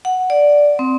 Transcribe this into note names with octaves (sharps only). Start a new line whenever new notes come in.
F#5
D5
C4